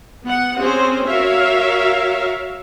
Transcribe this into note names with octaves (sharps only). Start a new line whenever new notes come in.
B3 F#5
C4 C#4 G#4 C5
F#4 A#4 C#5 E5 F5